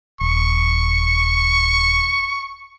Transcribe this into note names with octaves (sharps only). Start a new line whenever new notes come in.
D#1 C#6